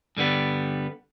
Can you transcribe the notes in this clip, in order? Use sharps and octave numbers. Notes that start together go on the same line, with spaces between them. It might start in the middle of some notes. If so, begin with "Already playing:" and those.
G2 D3 G3 B3